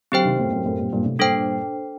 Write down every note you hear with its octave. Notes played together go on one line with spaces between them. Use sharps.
D3 F#3 C4 G4 C5 G5
C3 D#3
F#2 A2
F#2 A2
F#2 A2
G2 A#2
G2 A#2
A2 C3
G2 A#2 D4 A4 C5 G5